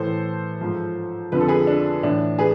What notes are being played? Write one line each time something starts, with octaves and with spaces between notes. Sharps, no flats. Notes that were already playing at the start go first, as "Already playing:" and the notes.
Already playing: A2 E3 A4 C5
G#2 F3
F2 D3 F3 B4
A4
G#4 B4
D4
A2 E3 D4
G#4 B4